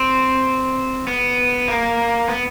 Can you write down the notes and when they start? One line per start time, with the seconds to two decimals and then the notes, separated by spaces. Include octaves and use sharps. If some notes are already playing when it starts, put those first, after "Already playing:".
Already playing: C4
1.07 B3
1.68 A#3
2.28 B3